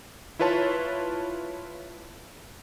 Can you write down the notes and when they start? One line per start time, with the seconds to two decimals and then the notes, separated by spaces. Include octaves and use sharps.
0.39 E4 F4 B4 C#5 A5